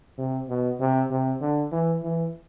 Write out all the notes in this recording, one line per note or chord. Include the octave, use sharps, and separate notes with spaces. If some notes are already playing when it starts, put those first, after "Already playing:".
C3
B2
C3
C3
D3
E3
E3